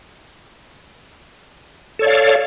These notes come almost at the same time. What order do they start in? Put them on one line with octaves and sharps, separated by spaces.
A4 C#5 D5 F5